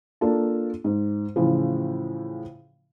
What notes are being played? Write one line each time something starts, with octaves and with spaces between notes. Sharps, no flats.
A#3 D4 F4 A4
G#2
A2 C#3 E3 F3